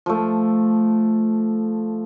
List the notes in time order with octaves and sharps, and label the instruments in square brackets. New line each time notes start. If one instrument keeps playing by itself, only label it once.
[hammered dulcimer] F3 A3